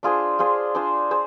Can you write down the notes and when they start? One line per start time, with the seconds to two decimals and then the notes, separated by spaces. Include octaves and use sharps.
0.03 D4 F4 G#4 C5
0.39 D4 F4 G#4 C5
0.75 D4 F4 G#4 C5
1.11 G#4 C5